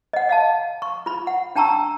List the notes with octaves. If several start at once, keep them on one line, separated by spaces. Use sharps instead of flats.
D#5 F#5
D#5 F5 A5
C#6
F4 B5
F#5
D4 G5 A5 A#5 C#6 E6